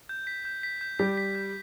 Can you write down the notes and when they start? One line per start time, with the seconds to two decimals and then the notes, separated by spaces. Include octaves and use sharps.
0.09 G6
0.27 B6
0.45 G6
0.63 B6
0.81 G6
0.99 G3 G4 B6
1.17 B6
1.35 G6